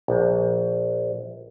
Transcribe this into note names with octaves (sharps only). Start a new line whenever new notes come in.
A#1